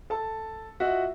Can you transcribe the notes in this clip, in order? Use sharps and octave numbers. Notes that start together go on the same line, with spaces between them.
A4 A5
F4 F#4 D#5 E5 F#5